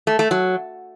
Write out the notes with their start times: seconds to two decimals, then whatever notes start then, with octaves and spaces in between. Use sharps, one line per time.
0.07 A3
0.19 A3
0.31 F#3